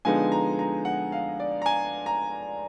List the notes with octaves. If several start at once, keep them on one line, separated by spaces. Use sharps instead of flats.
D3 F3 G#3 B3 D#4 G#5
A#5
A#5
F#5
F5
D5
A#5
G#5
A#5